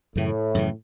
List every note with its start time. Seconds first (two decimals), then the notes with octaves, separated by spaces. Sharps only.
0.16 F#2 A2 C#3 E3
0.55 F#2 C#3 E3